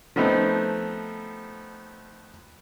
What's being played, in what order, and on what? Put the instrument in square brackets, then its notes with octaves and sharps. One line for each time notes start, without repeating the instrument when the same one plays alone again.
[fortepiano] F3 A3 B3 C4 D#4